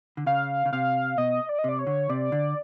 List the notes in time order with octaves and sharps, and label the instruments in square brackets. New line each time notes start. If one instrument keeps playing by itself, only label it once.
[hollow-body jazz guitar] D3
[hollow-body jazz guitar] C#3 [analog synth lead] F5
[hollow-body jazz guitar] C#3
[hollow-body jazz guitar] C3 [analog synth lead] F5
[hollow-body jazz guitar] B2 [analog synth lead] D#5
[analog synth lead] D5
D#5
[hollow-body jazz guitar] C3 [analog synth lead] D5
[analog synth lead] C#5
[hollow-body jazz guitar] D3
[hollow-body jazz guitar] C3 [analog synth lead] D5
[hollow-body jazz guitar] D3